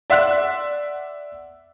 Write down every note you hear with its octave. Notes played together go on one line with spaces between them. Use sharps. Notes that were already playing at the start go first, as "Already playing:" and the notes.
D5 E5 F#5 C6 F#6